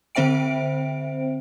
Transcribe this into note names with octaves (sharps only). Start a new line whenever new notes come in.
D3 C4 C5 E5 G5 D7